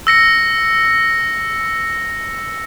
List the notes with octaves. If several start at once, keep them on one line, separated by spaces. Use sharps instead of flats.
E6 A#6 C#7